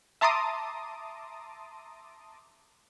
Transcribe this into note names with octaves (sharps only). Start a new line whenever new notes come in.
E5 A5 A#5 C6 D6 D#6